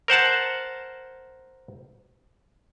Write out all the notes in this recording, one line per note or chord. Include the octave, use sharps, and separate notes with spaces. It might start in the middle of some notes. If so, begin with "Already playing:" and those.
A#4 C5 F#5 A5